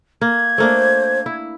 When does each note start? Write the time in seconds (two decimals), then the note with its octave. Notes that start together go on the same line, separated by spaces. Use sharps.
0.21 A#3 G#6
0.58 A3 A#3 D4 C5
1.26 E4